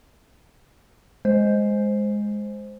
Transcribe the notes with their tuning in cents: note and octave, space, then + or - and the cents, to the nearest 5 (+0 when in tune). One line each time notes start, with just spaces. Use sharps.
G#3 +0 C5 +0